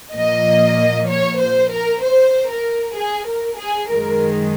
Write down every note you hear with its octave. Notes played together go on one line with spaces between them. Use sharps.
A#2 F3 A#3 D#5
C#5
C5
A#4
C5
A#4
G#4
A#4
G#4
F#2 D#3 G#3 A#4